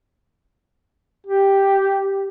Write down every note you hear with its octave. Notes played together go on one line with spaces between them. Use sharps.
G4